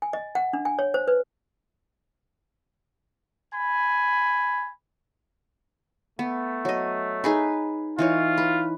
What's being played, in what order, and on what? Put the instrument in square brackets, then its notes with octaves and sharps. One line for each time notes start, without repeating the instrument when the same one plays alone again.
[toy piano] G#5
D#5
F#5
D4
G#5
C#5
C5
B4
[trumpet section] G#5 B5
[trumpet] A3 [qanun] B3
[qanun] F#3 D#5
D#4 G#4 B4
[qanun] E3 D#4 C#5 [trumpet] F4
[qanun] B4